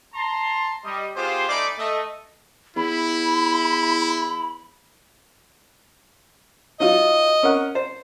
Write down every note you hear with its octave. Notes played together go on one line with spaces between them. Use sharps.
A5 A#5 C6
G3 D#5
B3 F4 G4 G#4 C5
A3 D#4 D5 G#5 B5 D6
A3 D#5
E2 E4 B5
F#3 D#4 F4 D#5
C#4 A#4 F#5
C5